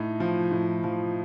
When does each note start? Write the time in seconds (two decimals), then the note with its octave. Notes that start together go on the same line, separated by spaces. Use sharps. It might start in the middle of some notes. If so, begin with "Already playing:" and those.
Already playing: A2 D#4
0.20 F3
0.51 A2
0.84 F3